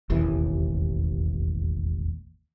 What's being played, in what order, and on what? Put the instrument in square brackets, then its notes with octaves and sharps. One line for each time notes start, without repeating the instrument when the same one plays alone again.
[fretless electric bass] E1 A1 D#2 E3